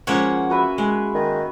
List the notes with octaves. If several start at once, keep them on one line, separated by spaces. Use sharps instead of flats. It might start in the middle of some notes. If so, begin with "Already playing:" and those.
F3 G#3 A#3 C#4 C#5 F#5
F#4 B4 E5
G#3
D#3